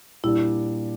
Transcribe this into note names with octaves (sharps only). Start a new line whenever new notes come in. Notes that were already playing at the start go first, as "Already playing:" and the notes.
A#2 G3 D4 E4